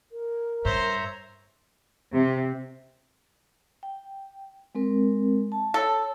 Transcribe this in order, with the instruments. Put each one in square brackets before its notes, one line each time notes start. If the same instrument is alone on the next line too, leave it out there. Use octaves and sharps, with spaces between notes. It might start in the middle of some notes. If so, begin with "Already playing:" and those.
[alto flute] A#4
[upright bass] G2 [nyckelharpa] C5 [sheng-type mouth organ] C#5 E5 A#5
[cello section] C3
[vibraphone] G5
G#3 C4 A#4
A5
[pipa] A4 [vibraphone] C#5